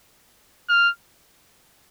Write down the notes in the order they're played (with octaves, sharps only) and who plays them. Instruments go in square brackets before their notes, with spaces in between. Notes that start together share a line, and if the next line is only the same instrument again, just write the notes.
[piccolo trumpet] F6